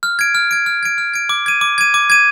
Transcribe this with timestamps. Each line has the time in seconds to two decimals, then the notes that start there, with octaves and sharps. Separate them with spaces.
0.03 F6
0.19 G#6 D7
0.35 F6
0.51 G#6 D7
0.66 F6
0.83 G#6 D7
0.98 F6
1.14 G#6 D7
1.29 D6
1.46 G#6 D#7
1.61 D6
1.78 G#6 D#7
1.94 D6
2.10 G#6 D#7